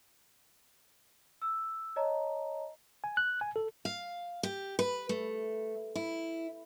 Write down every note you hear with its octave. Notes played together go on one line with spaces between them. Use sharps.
E6
C#5 D#5 A5 A#5
G#5
F#6
G#5
A4
F5
G4
B4
A3
E4